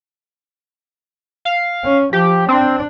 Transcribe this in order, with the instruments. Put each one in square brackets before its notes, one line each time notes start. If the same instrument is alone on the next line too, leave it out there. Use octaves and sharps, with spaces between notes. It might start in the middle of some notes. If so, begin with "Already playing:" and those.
[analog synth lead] F5
[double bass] C#4
[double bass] F3 [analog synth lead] G4
[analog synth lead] C4 [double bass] D4